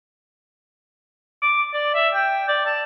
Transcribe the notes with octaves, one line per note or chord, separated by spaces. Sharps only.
D6
D5
E5
G5
D5
A5